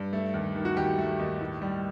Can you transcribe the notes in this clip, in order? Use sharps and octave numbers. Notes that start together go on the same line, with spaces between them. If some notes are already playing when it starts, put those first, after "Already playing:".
Already playing: G2
A3
D#2
D#3
F#4
D#2 G4
A3
D#2
A2
G3